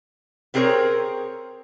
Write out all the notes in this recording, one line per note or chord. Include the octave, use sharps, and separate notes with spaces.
B3 C4 G#4 A#4 C5 C#5